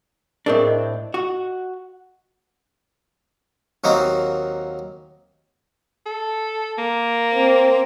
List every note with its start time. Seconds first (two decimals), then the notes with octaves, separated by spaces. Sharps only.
0.46 A2 C4 D4 G#4 A#4 D#5
0.67 D#5
1.14 F#4
3.84 D#2 F#3 A#3 C4 D#4
6.06 A4
6.78 A#3
7.34 C4